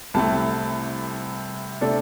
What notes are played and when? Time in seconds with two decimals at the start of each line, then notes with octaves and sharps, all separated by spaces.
0.14 C2 C3 A3 A5
1.81 C3 A3 D4 A4